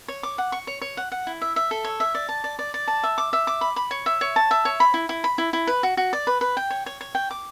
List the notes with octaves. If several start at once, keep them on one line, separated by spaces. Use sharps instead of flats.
C#5
D6
F#5
C#6
C#5
C#5
F#5
F#5
E4
E5
E5
A4
C#5
E5
D5
A5
D5
D5
D5
A5
E5
D6
E5
D6
B5
B5
C#5
E5
C#5
A5
E5
C#5
B5
E4
E4
B5
E4
E4
B4
F#4
F#4
D5
B4
B4
G5
C#5
C#5
C#5
G5
D6